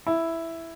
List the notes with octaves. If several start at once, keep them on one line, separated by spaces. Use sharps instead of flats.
E4